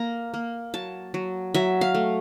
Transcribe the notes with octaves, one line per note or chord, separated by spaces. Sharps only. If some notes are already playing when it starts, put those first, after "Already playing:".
Already playing: A#3 A#5
A#3
F#3 A5
F#3
F#3 E5
F5
A3